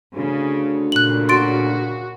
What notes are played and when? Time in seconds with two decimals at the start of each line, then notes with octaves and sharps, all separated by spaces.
0.15 D2 C#3
0.92 A#2 C#3 F#6 F#7
1.29 F#4 C6 A6 D7